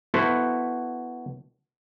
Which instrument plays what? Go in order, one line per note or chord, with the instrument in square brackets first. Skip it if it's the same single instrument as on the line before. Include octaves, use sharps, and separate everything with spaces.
[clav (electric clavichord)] B3 E4 F#4 A4 C5